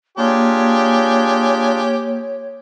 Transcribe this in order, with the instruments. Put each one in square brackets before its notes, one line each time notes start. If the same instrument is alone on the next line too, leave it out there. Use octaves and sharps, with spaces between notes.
[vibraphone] A#3 [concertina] D4 F4 G#4 [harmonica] G4 G#5 [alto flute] C#5